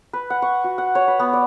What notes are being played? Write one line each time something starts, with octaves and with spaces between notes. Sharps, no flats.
B4
F#5
C#6
F#4
F#5
C#5
B4
B3
D5